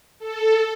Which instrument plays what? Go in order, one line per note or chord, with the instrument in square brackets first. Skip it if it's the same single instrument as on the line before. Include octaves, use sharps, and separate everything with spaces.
[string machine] A4